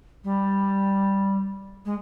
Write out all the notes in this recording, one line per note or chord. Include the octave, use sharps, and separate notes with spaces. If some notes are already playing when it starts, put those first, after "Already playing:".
G3
G#3